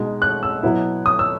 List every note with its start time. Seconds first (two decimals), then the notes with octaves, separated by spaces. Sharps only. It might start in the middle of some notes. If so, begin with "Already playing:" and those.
Already playing: B2 G#3 D#4
0.22 F#6
0.43 E6
0.63 B2 F#3 B3 E4
1.06 D#6
1.19 E6